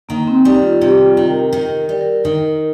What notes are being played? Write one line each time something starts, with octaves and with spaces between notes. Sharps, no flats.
D#3 A#3
C4
G3 D#4
F4
C3 G4
F4
D#3
A#4
D#3 A#4
A#4
G3
A#4
D#3